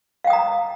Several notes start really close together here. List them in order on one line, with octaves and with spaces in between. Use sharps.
F5 G5 D#6 A#5